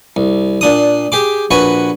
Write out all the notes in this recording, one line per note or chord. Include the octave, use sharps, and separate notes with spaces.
C2
A#2 D4 D#6
G4 G#4 D6
A#1 F#4 B4 G#5 C#6